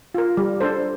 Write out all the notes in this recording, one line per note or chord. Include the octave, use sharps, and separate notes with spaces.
F4 A#4
G3
D4 A4 C5